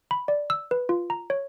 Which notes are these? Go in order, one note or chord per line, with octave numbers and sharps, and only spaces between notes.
B5
D5
E6
B4
F4
A#5
C#5